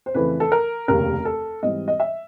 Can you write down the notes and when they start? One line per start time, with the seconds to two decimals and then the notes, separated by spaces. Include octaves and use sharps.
0.06 C5
0.14 F2 C#3 E3 A3 B4
0.40 A4
0.52 A#4
0.88 F1 D#2 C#3 A#4
1.25 A4
1.63 G#2 E3 G3 C4 D#5
1.88 D#5
2.00 E5